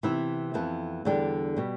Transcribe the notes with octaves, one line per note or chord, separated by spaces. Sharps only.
C3 E3 B3 E4
F2 E3 B3
E2 D3 G3 D4 G4
B2 G3